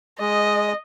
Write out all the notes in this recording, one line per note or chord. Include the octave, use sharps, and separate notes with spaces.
G#3 D#5